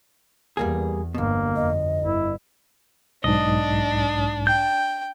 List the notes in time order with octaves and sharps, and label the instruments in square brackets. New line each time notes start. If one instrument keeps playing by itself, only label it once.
[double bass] E2 [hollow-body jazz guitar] G3 A#3 G#4
[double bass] G1 G2 [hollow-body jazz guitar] D2 B2 [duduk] A#3
[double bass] F2 [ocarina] D#5
[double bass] G1 [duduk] E4
[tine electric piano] B1 G#2 [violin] D4 [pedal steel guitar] D#5
[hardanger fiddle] G5 [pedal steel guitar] G6